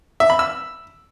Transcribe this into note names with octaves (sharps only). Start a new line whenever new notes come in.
E5
B5
E6